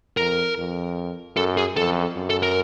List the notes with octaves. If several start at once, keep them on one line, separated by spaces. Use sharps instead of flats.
F2 A#4
F2
F#2 A4
G#4
F2 A4
F#2
A4
A#4